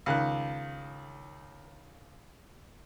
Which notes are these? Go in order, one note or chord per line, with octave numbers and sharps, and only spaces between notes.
C#2 D#3 F#6